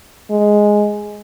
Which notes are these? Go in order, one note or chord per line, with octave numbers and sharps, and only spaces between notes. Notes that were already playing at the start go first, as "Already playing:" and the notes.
G#3